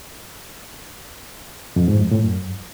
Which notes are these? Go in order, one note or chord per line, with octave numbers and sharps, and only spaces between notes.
F2
G#2
F2
A2
F#2